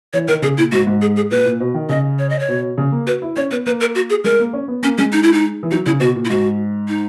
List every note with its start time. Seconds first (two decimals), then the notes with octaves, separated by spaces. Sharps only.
0.13 E3 C#5
0.28 D#3 A#4
0.42 C#3 G#4
0.57 A#2 E4
0.72 G#2 F#4
0.87 G#2
1.02 G#4
1.16 G#4
1.31 A#2 B4
1.45 A#2
1.60 B2
1.74 D#3
1.89 C#3 D#5
2.19 C#5
2.30 D#5
2.39 C#5
2.48 B2
2.78 C#3
2.92 A#3
3.07 F#4 B4
3.22 E4
3.36 C#4 C#5
3.51 B3 B4
3.66 A#3 B4
3.80 A#4
3.95 F#4
4.10 G#4
4.24 G#3 A#4
4.40 A#3
4.53 C#4
4.68 B3
4.83 A#3 C#4
4.98 G#3 C#4
5.13 D#4
5.23 E4
5.33 D#4
5.63 E3
5.71 F#3 D#4
5.86 C#3 E4
6.00 B2 F#4
6.16 A#2
6.25 E4
6.30 G#2 F#4
6.88 D#4